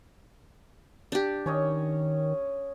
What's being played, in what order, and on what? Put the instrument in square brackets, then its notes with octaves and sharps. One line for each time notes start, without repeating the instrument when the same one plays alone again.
[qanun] D4 G4
[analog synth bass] D#3 [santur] C#4 C#5 D#5